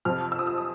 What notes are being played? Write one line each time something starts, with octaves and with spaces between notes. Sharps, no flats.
F2 C3 F3 F6
E6
D#6
E6
D#6